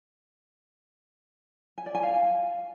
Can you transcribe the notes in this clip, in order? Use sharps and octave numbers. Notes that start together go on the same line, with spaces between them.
G#5
D5
G#5
F5